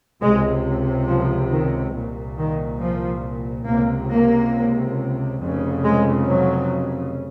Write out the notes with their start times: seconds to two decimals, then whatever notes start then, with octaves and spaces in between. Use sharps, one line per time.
0.21 C#2 C3 G#3
1.07 F3
1.50 D#3
1.94 C2 A#2
2.37 D#3
2.81 F3
3.67 C#2 C3 A#3
4.10 A#3
5.40 F1 F2 C#3
5.84 G#3
6.26 F#3